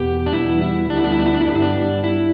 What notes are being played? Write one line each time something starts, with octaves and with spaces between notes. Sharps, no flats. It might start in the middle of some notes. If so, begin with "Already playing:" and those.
Already playing: E2 B2 B3 G4
D4
E2 B2 G3 B3 E4
E4
D2 D3 G3 B3 D4
E4
D4
E4
D4
E4
D4
E4
G2 G3 B3 D4
E4
D4
E4